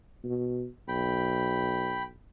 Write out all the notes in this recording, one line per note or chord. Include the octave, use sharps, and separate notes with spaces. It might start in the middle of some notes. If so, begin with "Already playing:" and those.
B2
B1 G5 B5